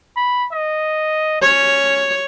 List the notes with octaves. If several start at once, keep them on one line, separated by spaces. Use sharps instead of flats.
B5
D#5
C#4 C#5